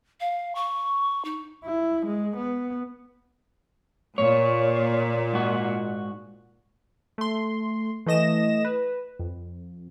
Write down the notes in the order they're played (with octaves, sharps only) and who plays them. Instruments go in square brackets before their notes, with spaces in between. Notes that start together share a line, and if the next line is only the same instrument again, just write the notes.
[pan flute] F5
C#6
D#4
[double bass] E4
G#3
B3
[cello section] A#2 [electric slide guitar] C#5
[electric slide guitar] G#2 F#4
[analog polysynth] A3 C6
E3 A3 D#5 A#6 E7
B4
F2